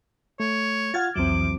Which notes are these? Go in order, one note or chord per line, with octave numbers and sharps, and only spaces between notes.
A3 C#5
F4 F#5 F6 G#6 A6
C2 F2 E3 F#3 C4 D6